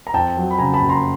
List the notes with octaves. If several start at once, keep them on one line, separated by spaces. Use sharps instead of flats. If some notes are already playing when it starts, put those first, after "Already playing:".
A#5
F2 G5 A5
F#3
B5
C#3 G#5 A#5
A5 B5
F#1
A#5 C6